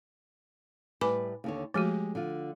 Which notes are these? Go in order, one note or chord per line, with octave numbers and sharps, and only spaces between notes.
A2 G3 B4 G#5 B5 D6
D#2 D3 C#5
F3 G#3 A3 F#4 G4
D3 F4